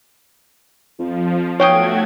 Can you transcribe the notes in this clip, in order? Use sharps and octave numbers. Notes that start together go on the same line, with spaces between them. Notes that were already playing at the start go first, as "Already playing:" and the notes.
F2 F3
B1 A3 F#4 C#5 F5 G5 D#6 G#6